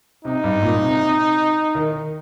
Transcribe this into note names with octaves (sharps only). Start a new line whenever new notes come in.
C3 D#4
G2
A#2
C3
D#3